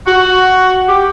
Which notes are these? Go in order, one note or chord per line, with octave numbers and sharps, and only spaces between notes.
F#4
G4